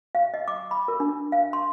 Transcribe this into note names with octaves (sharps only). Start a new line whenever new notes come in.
F5
D#5
D6
B5
A#4
D4
F5
C6